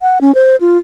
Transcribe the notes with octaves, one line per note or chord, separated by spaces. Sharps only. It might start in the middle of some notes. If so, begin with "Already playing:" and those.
F#5
C#4
C5
F4